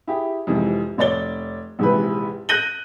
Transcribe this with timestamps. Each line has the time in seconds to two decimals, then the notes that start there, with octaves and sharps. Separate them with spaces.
0.07 E4 G4 G#4
0.47 F2 G#2 C3 E3
0.98 F1 C#5 D5 A6 G7
1.79 A#1 G#2 C3 E3 B4
2.49 F#6 G6 A#6 D#7 F#7 G7